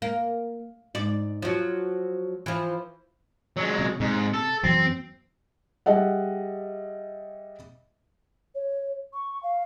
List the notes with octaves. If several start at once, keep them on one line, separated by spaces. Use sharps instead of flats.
A#3
G#2 D5
F3 F#3
E3 F3
F#3 G#3
C3
G#2 C3
A4
F#2 E3 F#3 C4
G3 G#4 D#5 E5 F#5
C#5
C#6
F5